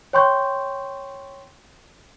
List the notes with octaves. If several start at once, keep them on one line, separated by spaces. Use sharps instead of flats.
C#5 G5 C6 C#6 G6